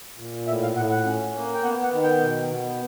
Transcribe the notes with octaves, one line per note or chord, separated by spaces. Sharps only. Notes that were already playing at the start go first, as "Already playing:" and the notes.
A#2
A2 E5
F5
A2 F#5
F#5
C#4
A#3
G5
B3 F#5
F#5
D#3
G5
B2
B3